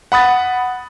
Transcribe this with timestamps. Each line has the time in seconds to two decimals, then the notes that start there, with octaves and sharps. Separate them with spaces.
0.12 F#5 B5 D#6 A6